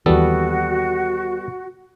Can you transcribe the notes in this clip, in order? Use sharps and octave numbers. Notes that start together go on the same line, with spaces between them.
D#2 E3 G3 B3 F#4 A4